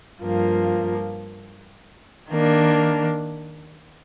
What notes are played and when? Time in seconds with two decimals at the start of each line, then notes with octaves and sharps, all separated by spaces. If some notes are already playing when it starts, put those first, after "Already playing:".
0.20 G2 F3 A#3
2.30 D#3 A#3 D4